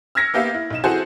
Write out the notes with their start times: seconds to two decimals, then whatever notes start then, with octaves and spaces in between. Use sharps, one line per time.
0.15 E6 F6 G#6 A#6 B6 C#7
0.34 A#3 B3 G4 E5 F5
0.54 E4
0.70 B1 D#4 E7
0.84 E3 C4 F#4 G#4 A4 C5